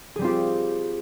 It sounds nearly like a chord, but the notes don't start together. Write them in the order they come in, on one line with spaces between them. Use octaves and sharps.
G#4 G3 C4 F4 G4